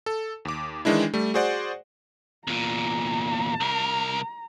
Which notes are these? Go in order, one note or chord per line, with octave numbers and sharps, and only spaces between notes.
A4
D#2 D6
D#3 E3 G#3 D4 E4
G3 A3
F#4 G#4 C5 D5 F#5
E2 A#2 A#5
C2 A#4